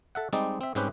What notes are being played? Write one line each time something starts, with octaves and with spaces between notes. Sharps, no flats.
A4 E5 F#5
G3 G#3 C4 D#4 D5
C4 E5
G#2 G3 C4 C#4 G4 B4